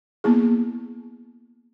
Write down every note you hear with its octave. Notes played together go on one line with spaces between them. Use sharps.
A#3 B3 E4 G#4